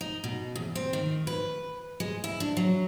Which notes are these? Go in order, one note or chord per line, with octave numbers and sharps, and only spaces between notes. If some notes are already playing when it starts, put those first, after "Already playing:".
D#4
B2
E2
C4
D#3
B4
G#3
E4
D4
F#3